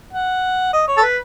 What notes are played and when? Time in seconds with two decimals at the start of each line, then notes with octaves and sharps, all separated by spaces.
0.13 F#5
0.73 D#5
0.88 C#5
0.97 A4
1.02 B4